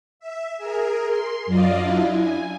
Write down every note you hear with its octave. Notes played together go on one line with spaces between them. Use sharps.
E5
G#4 A#4
C6
F#2 F#3 F4 D5 D#5 F5
D4 E4
G#5